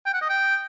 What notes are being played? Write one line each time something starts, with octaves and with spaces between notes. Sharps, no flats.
G5
F#5
D#5
G5